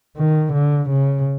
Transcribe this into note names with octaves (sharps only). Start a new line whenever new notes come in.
D#3
D3
C#3